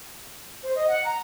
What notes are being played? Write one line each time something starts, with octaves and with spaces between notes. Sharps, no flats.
C5
D#5
F#5
A#5